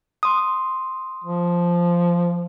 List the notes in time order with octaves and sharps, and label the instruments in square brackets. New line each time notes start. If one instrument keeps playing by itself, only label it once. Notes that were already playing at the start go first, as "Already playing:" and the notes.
[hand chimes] C6 D#6
[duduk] F3